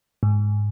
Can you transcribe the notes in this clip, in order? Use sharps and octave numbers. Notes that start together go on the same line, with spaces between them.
G#2